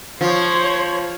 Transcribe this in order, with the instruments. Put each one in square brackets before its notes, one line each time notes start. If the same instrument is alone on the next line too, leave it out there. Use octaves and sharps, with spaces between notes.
[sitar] F3 [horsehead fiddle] C5 [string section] C#5